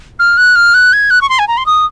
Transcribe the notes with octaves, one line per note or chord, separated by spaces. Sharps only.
F6
F#6
F6
F#6
G#6
F#6
C#6
C6
G#5
A#5
C6
D#6